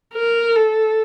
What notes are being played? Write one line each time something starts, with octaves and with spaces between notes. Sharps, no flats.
A#4
A4